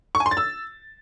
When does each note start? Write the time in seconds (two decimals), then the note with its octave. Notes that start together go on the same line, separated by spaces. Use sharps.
0.15 C#6
0.20 G#5
0.26 C6
0.31 A6
0.37 E6